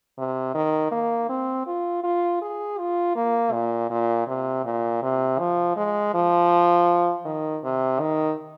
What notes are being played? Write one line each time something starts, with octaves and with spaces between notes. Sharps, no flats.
C3
D#3
A#3
C4
F4
F4
G#4
F4
A#3
A#2
A#2
C3
A#2
C3
F3
G#3
F3
D#3
C3
D#3